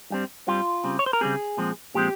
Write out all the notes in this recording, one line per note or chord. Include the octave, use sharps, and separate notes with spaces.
G2 G3 C4
G2 G3 C4 F4
C#3 G3 C4
C#5
C5
A#4
C#3 G3 C4 G#4
A#2 F3 G#3 C4
A#2 F3 G#3 C4 G4